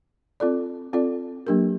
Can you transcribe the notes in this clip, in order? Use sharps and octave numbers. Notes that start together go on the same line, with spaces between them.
C4 F4 A4 D5
C4 F4 A4 D5
F#3 A#3 D4 G4 A#4